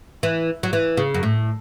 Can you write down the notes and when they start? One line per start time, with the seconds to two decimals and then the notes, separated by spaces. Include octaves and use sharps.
0.23 E3
0.63 F#3
0.73 E3
0.97 C#3
1.14 F#2
1.23 A2